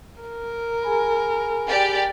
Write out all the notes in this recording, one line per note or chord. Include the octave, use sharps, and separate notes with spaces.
A#4
G#4 G#5 B5
G4 D5